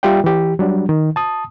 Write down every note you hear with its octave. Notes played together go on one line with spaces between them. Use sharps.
G3 F4 G4 D5 E5 G5
E3 G4
F#3 G3 D4
D#3
A5 D#6